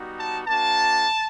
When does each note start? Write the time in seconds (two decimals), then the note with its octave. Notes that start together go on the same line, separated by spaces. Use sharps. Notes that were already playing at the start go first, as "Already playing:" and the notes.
Already playing: G3 B3 D#4 F#4
0.18 A5
0.47 A#3 D4 F#4 A5